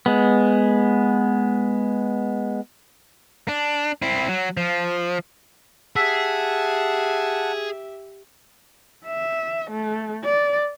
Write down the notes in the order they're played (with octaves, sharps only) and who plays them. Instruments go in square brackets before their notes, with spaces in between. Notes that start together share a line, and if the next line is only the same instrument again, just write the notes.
[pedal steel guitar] G#3 B3
[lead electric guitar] D4
C4 E4
F#3
F3
[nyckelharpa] G4 E5 [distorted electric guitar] G#4 [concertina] F#5 A5 [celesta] E6 B6
[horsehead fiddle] E5
A3
D5